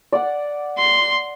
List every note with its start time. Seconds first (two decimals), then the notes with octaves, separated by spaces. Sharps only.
0.12 D5 F#5
0.78 C6